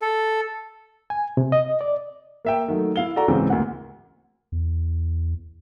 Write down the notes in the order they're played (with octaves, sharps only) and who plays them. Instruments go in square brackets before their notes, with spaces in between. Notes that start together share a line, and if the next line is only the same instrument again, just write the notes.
[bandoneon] A4
[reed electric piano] G#5
C3
D#5
D5
[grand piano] A#3 E5 G5
D#3 F#3 A3
E4 F5 G7
F#4 A4 D5 A#5
C#2 G#2 C#3 E3 C4
D2 A#3 F#5
[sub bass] E2